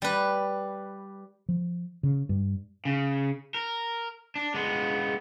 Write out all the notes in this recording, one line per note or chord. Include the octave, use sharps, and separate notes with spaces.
G3 B4
F3
C#3
G2
C#3
A#4
D4
G#3 B3